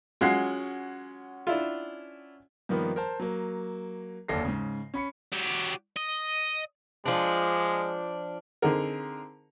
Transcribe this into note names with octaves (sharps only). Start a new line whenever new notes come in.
F#3 G#3 C#4 F4 F#5 C7
D4 E4 F4
G2 D#3 F3 A#3 B3
A#4 C5 A5
F#3 A#3
F#1 D#2 D3 A4 A#6 C7
G#2 C#3
C#4 B5 C#7
F#3 G4
D#5
F3 G#3 D4
D3 C4 D#4 G#4 A#4